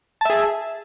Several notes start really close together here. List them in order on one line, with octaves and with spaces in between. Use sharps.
A5 E5 G#4